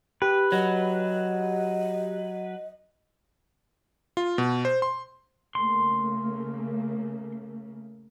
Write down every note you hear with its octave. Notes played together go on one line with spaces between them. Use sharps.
G4 B4
F#3 D#5
F4
B2
C5
C6
C#3 A3 A#3 C6